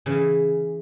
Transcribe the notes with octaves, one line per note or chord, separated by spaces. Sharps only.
C#3 E3